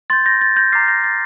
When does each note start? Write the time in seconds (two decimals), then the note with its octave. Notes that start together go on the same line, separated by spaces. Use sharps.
0.10 C6 G6 A6
0.26 G6 A#6
0.41 A6
0.56 G6 A#6
0.72 A#5 D6 F6 A6 C7
0.88 G6 A#6
1.04 A6